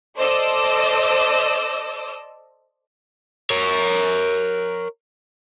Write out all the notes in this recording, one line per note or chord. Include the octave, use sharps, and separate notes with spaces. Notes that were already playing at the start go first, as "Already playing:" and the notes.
A4 C5 D5 D#5 D6 E6
A#4 C#5